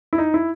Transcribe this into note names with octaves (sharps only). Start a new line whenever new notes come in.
E4
D#4
E4